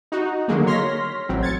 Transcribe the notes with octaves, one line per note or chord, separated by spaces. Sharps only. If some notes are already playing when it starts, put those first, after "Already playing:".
D#4 F#4
D3 D#3 F#3 G#3 A#3
C#5 C6 F6 A#6 B6
A1 F#3 C4
G#6 A6 C#7